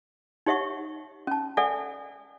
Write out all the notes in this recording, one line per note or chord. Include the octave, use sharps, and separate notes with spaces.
D#4 G4 C#5 E5 F#5 C#6
C#4 A5
A4 D5 E5 F#5 G#5